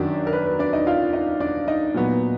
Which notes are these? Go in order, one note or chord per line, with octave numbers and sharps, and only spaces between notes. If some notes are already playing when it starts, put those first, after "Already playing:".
Already playing: F#2 D#3 F#3 D4 D5
A#4
B4
B4
D4 D5
D#4 D#5
F4 F5
D#4 D#5
D4 D5
D#4 D#5
A#2 F#3 B3